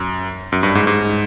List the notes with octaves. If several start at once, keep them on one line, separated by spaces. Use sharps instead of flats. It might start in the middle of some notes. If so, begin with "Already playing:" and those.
Already playing: F#2
F#2
G2
G#2
G#2